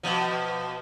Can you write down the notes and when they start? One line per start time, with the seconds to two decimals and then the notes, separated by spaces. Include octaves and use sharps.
0.03 B2 F3